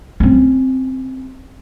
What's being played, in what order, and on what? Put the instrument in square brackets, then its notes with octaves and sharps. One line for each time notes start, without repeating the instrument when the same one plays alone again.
[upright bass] C4 C#4